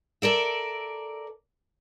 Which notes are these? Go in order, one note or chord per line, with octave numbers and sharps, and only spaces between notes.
A4 A#4 D5 E5